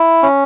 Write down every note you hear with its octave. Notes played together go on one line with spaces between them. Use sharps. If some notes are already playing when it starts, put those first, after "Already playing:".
Already playing: E4
C#4